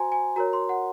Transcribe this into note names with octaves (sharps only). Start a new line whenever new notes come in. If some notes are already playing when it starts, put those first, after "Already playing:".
Already playing: F#4 C5 G#5 A#5 C6
G#5
F#4 A#4 C#5 A#5
C6
F#5